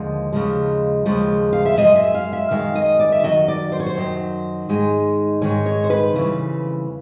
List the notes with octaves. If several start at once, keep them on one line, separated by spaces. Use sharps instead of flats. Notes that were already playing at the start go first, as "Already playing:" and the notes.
Already playing: D#2 D3 F3 G#3 D5
D#2 C#3 F3 G#3
D#2 C#3 F3 G#3
F5
E5
F#2 D#3 G#3 D#5
E5
F5
E5
F#2 D#3 G#3 F5
D#5
D5
E5
F#2 D#3 F#3 D#5
D5
C5
C#5
C5
F#2 D#3 F#3
G#2 D#3 G#3
G#2 D#3 G#3 C#5
C#5
C5
B4
F2 C#3 E3 G3